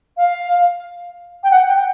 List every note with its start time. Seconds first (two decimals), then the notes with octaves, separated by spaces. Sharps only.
0.17 F5
1.44 G5
1.51 F#5
1.68 G5